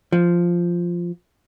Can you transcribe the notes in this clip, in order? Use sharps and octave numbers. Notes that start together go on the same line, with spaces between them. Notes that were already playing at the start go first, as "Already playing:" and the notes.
F3